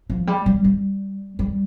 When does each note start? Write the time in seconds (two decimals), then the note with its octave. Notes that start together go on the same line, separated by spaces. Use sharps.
0.10 F3
0.27 G3
0.46 G3
0.64 G3
1.39 G3